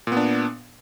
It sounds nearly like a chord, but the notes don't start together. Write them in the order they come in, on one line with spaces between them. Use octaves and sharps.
A#2 B3 D4